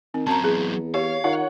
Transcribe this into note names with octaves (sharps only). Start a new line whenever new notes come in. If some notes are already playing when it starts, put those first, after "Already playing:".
D#3 C4
F#2 F#3 C4 A5 A#5
E2 G#4
G4 C#5 F5
D#3 F4 C#5 F#5